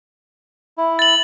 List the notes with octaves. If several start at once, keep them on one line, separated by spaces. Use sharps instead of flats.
E4
A6 F#7